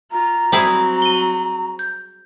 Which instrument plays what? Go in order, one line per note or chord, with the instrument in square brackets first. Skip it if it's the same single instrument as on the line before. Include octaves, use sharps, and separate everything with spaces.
[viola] F4 [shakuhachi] A#5
[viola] F#3 C4 [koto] G3 E4 G#4 [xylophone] C5
[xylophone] D#7 G7
G6